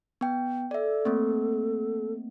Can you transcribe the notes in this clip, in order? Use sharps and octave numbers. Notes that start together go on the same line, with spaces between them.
B3 G5
A4 D5 E5
A3 A#3 C4